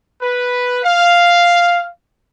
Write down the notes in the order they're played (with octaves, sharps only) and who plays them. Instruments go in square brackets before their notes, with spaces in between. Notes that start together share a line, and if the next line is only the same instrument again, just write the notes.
[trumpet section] B4
F5